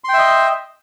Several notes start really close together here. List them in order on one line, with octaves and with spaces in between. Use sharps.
C6 G5 E5 D#5